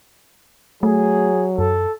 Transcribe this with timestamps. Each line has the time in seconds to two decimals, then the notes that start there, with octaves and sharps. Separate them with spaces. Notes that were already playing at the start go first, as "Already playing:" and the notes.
0.83 F#3 A3 G#4
1.59 F#2 A4